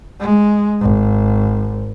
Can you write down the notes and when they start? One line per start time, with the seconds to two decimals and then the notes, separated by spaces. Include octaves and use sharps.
0.20 G#3
0.81 G#1